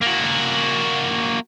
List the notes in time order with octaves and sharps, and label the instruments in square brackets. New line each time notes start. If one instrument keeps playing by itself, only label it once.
[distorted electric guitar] A#3 F#4